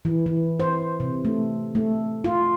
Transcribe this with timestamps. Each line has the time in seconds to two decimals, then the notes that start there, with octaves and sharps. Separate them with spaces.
0.05 E3
0.26 E3
0.60 C5
1.00 C3
1.25 A3
1.75 A3
2.24 F4